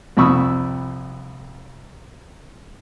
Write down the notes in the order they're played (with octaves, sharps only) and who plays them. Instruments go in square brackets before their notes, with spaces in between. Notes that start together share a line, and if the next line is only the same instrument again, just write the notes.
[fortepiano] C2 F2 B5 C#6 D#6 E6